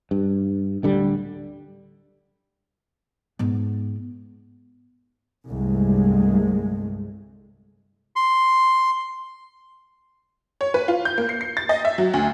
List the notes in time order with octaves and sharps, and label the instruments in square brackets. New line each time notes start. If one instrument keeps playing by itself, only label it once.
[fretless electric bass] G2
D1 D3 G3
[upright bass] G#2 B3
[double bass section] G1 C2 G2 G#3 A3
[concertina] C6
[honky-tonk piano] C#5
B4
F4
G6
A#3
C7
C7
A6
D#5
E5
F#3
D2